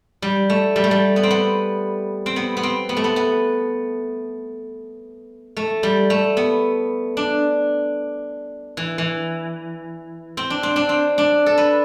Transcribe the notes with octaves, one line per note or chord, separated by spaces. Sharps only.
G3
A3
G3
A3
G3
B3
C4
B3
C4
B3
B3
C4
B3
A3
B3
B3
A3
G3
A3
B3
D4
E3
E3
C4
D4
C4
D4
C4
D4
A4
B4